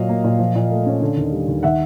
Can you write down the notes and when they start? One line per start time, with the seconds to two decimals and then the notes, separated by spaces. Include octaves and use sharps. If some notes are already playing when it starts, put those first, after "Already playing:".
Already playing: A#2 F#3 D#5 F5
0.09 A#3
0.24 A#2
0.39 F3
0.55 A#2
0.70 A3
0.86 C#4
1.01 D3
1.17 D#2
1.32 G3
1.48 D#2
1.63 D#3 E5 F#5